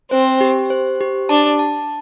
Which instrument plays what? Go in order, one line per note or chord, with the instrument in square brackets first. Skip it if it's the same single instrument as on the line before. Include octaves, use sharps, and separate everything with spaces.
[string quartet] C4 [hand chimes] C5
[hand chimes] G4
C5
G4
[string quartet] D4 [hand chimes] A5
[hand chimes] A5